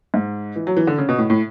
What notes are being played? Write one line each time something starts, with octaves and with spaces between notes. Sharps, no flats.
G#2
E3
F#3
E3
D3
C#3
B2
A2
A2